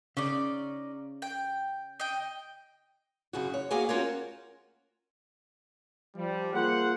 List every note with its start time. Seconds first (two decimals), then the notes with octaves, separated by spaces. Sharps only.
0.17 C#3 C#4 D#4 D5
1.22 G5
2.00 D#5 G5
3.33 F#2 C#3 F#4
3.54 C#5
3.71 A#3 B3 F#4 G#4 F5 G#5
3.89 C#4 F4 F#4 A#4 C5 C#5
6.16 F3 G3
6.54 A#3 F4 G#4 C5 F#5